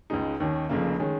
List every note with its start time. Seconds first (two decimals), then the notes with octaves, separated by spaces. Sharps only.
0.10 C#2 C#3 G#3 D#4
0.40 D#2 D#3 C#4
0.69 F1 F2 C#3 A#3
1.00 D#3 G#3 C#4